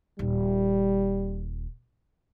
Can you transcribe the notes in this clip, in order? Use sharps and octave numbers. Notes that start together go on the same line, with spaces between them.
D#1 G3